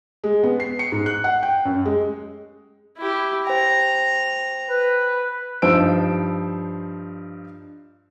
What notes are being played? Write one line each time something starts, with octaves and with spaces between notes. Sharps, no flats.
G#3
B3
C7
C#7
G#2
F#6
F#5
G5
F#2
G#3
E4 G4
C5 G5 A#5
B4
G2 F3 D#4 C5 E6 D7